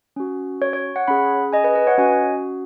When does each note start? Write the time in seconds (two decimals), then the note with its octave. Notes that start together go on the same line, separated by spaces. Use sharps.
0.16 C#4 F#4
0.62 C#5
0.73 C#5
0.96 C#5 F#5
1.08 C#4 G#4 F#5 B5
1.52 D#5 G#5
1.64 B4 D#5
1.75 B4 D#5
1.87 C#5 F#5
1.98 C#4 F#4 D#5 G#5